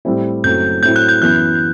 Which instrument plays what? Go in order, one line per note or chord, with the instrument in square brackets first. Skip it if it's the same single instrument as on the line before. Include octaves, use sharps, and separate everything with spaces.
[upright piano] A2 G3 C4 E4
[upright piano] F#1 F#2 F#3 A3 C4 [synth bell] G6
[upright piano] A2 F#3 A3 C4 E4 [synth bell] G6
[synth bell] F#6
G6
[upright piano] F#2 E3 B3 E4 [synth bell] F#6